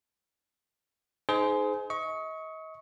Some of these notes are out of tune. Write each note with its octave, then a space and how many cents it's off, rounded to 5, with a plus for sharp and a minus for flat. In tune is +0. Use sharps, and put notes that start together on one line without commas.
D#4 +0 G#4 +25 C5 -25
D#5 +35 C#6 +0